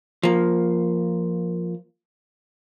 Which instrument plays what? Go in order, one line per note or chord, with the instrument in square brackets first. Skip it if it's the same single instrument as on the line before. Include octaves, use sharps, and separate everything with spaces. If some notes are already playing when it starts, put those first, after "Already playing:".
[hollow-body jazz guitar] F3 A#3